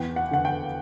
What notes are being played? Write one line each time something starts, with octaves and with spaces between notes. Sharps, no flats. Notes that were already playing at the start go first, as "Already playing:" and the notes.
Already playing: E2 G5
F#5
D3 F#5
G5